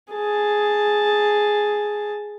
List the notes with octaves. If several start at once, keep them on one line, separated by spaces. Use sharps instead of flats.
G#4 A5